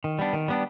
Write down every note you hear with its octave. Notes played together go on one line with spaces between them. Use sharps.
D#3
G3 B3 D4
D#3
G3 B3 D4